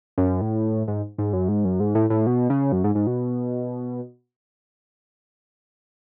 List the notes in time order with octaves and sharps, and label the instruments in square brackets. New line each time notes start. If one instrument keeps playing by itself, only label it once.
[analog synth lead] F#2
A2
G#2
G#2
F#2
G#2
F#2
G#2
A2
A2
B2
C#3
F#2
G#2
G#2
B2